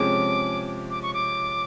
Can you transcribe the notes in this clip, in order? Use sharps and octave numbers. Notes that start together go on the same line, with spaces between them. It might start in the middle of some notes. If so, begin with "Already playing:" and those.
Already playing: C3 F3 G#3 C#4 D6
D6
C#6
D6